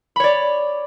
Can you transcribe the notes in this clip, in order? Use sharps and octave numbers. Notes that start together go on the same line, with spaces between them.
C#5 D5 B5